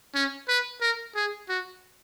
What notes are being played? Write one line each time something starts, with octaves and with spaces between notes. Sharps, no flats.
C#4
B4
A#4
G#4
F#4